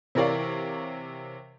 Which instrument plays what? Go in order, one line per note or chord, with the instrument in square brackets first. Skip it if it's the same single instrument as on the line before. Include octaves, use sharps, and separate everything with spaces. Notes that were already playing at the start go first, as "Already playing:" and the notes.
[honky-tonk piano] C3 E3 A#4 C#5 D5 F5